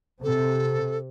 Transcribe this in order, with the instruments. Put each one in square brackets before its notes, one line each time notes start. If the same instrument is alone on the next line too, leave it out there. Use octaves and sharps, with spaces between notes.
[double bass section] C3 [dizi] A4